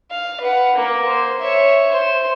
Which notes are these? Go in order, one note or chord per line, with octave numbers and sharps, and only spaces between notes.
F5
B4 F#5
A#3
C5
C#5 E5
C5